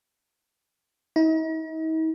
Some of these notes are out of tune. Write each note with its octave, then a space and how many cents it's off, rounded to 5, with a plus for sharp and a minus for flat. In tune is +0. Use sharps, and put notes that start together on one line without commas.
D#4 +45